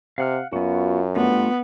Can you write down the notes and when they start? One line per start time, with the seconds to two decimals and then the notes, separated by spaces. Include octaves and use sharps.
0.18 C3 F5 F#5 F6
0.53 F#2 B3 F4 F#4
1.16 G2 A3 B3 D4 F4